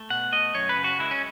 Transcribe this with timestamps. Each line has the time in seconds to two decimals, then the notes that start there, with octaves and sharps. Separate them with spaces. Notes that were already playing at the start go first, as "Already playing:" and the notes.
Already playing: A3
0.10 B2 F#5
0.32 A3 D#5
0.55 F#2 C#5
0.69 B4
0.77 C#3
0.84 F#4
0.99 G#3 E4
1.11 C#4